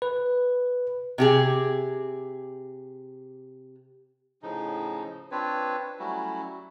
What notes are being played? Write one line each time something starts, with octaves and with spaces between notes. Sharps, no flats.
B4
C3 G4 G#4
A2 C#3 F3 D#4
C4 D4 F4 B4 C#5
F#3 G3 A3 C#4 E4 F#4